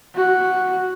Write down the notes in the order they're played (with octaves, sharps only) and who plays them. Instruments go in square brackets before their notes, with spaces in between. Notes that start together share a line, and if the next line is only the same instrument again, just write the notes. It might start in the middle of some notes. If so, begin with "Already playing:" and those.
[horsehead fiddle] F#4